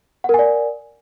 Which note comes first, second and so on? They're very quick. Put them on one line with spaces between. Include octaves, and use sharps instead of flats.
F#5 A#4 G#5 D5